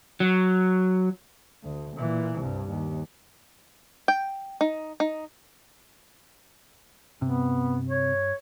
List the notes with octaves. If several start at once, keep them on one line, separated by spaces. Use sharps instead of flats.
F#3
D2
A#2 E3
C2 G2
D#2
G5
D#4
D#4
G2 C3 B3
C#5